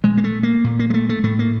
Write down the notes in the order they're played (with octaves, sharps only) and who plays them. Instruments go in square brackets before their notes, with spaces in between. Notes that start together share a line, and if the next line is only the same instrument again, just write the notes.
[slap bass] A#2 G#3
A#3
A3
A#3
A#2
A#3
G#3
A3
A3
A2 A3
A#3